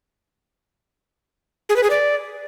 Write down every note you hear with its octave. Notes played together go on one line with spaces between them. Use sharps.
G#4
B4
G#4
D5